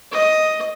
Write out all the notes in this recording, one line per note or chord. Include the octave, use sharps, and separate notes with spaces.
D#5